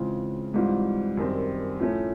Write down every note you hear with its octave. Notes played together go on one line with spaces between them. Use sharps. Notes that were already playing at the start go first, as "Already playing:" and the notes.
Already playing: C#3 E3 G#3 C4 F4
G#2 E3 G3 C4 F4
F#2 D#3 G3 C4
A2 F3 A3 C#4